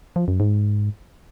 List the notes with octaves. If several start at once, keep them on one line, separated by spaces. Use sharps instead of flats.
F3
F#2
G#2